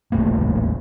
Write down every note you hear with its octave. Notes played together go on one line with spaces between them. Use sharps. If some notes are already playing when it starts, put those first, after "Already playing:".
D#1 A1 A3 A#3